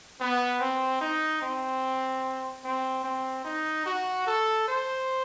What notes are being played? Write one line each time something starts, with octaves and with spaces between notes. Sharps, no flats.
B3
C4
D#4
C4
C4
C4
D#4
F#4
A4
C5